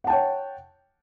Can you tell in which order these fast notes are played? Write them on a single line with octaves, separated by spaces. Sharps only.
F#5 A5 G5 C#5